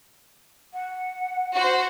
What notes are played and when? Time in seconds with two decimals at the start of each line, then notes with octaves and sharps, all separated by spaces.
0.73 F#5
1.55 F#4 C5